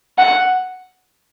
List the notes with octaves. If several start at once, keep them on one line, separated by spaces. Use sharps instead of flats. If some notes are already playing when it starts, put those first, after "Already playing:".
F#5